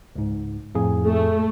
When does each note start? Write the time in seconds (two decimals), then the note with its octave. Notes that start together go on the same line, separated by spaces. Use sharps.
0.15 C#2 G#2
0.75 F2 A2 G#4
1.06 A3